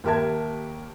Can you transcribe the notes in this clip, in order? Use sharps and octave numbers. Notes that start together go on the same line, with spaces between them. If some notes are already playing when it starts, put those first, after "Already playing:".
D#2 G4 A#4 E5 A5 G#6